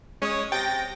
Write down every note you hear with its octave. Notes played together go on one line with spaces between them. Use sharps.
G#3 C#4 C#5 D#6
C3 G5 A6 A#6